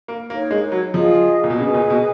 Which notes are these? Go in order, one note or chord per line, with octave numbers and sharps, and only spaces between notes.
A#3
A#3 D#4 A#4 C#5
G#3
F#3
F3 F4 G#4 D#5
A#2
B2
C#3 G#4 B4 D#5 G#5
B2
A#2
B2